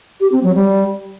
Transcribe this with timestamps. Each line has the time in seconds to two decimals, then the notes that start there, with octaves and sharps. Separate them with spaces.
0.20 G4
0.32 C4
0.43 F#3
0.55 G3